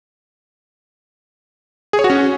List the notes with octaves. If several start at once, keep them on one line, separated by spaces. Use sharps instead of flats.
G#4
C#5
F#4
C#4